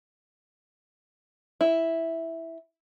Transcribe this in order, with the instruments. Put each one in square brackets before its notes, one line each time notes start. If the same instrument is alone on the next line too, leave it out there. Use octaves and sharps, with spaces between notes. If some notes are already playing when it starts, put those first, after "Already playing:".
[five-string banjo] E4